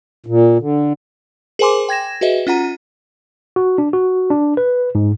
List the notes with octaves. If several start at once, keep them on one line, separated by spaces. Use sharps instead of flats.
A#2
D3
G#4 A#4 C5 G#5 C6 D6
G5 G#6 A#6 E7
F#4 G#4 B4 D#5 E5
C#4 F4 F#5 A#5 D#7
F#4
D4
F#4
D4
B4
G#2